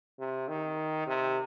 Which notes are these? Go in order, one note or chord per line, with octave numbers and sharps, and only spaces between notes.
C3
D#3
C3